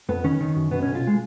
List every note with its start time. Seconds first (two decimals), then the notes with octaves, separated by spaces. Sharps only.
0.09 F2 B3
0.24 D#3 C#4
0.41 D#3
0.56 F#2
0.71 B2 B3
0.82 B1 C#4
0.95 F4
1.07 G#3